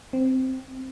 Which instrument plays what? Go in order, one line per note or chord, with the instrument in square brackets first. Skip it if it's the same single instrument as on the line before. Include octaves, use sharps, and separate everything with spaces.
[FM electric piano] C4